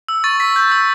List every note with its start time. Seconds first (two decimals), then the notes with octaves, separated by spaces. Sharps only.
0.08 E6
0.24 C#6 A6
0.40 C#6 B6
0.56 G6
0.72 E6